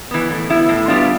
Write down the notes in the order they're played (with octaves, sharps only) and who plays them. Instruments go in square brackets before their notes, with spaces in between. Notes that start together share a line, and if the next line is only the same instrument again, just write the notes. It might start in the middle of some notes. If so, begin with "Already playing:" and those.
[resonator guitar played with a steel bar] E3 B3
A2
G3 B3 E4
A2
G3 B3 D4 F4